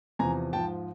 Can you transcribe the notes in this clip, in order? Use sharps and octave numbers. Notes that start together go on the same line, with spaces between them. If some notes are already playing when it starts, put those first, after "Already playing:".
E2 C3 F3 G#5 A#5
G#2 F3 G5 A5